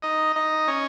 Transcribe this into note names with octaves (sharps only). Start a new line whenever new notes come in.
D#4 D#5
D#4 D#5
C#4 C#5